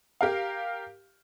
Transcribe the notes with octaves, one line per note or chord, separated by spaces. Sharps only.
G4 A#4 F5